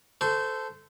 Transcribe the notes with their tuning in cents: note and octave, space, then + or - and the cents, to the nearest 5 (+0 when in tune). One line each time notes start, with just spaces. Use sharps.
A4 +0 C5 -20 C#6 +0